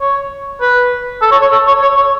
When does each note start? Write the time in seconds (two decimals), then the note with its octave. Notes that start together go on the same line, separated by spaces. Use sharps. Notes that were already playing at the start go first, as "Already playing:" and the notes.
0.01 C#5
0.61 B4
1.22 A4
1.32 C#5
1.42 C#5
1.52 A4
1.67 C#5
1.82 C#5
1.96 C#5